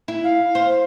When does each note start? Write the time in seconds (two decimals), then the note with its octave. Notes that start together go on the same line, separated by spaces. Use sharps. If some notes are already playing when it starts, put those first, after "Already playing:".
0.08 E4
0.24 F5
0.55 C5